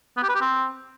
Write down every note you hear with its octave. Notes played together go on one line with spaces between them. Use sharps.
B3
G4
B4
G4
C4